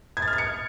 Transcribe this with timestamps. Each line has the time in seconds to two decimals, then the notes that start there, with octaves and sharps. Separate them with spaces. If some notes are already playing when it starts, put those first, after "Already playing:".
0.17 G#6
0.22 A6
0.28 F6
0.33 G#6
0.38 C#7